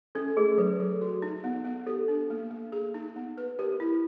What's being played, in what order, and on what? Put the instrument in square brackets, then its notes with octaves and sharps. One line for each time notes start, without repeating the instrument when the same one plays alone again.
[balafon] C#4 [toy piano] A4
[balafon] A3 [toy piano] G#4
[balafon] F#3 [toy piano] B4
[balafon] F#3 [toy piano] A4
[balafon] F#4
D#4
B3
B3
[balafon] G4 [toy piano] A4
[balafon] D4
A#3
A#3
G#4
D#4
B3
B4
[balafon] G4 [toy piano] A#4
[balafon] E4